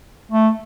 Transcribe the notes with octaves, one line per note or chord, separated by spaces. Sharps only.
A3